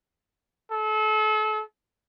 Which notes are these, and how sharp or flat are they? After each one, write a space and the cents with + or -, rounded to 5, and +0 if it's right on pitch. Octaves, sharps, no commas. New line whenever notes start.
A4 -35